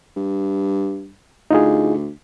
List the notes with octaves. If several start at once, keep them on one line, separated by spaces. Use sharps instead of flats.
G2
D2 D#4 F4 G#4